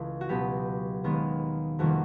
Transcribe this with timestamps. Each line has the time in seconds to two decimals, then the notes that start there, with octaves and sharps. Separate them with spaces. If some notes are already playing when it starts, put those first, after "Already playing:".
Already playing: C#2 C#3 E3 A3
0.21 F#4
0.29 C#2 B2 F#3 B3 G4
1.04 D#2 D#3 G#3 B3
1.79 F2 C3 D#3 G3 A#3 F#4